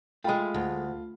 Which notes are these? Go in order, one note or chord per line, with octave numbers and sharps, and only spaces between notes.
G#3 A3 F4 G5 B5
D2